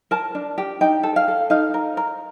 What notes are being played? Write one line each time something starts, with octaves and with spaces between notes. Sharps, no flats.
A#4 A5
D4
G4
D#4 G5
A4
F5
A4
D#4 F5
A#4
A#4